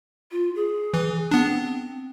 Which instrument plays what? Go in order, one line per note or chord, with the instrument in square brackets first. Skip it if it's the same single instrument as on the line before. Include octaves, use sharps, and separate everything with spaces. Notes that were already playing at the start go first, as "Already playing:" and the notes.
[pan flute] F4
G#4
[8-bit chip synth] E3
[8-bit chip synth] B3 D4 [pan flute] C4